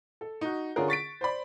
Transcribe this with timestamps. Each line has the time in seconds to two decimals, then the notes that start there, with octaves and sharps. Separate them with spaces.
0.21 A4
0.41 D#4 F#4
0.76 D3 C#4 F4 G#4 A#4
0.88 C#6 A6 B6 D7
1.21 C5 D5 B5